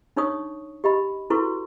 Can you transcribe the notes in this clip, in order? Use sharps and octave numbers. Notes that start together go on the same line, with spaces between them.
D4 D#4 C#5 C#6 D#6
G4 D#5 B5
E4 F#4 A4 B4 C6 C#6